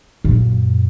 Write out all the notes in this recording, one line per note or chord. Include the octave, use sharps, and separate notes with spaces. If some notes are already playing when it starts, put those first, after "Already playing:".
F#2 A#2